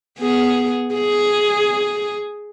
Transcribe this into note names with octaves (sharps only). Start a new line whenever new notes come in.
B3 G#4
G#4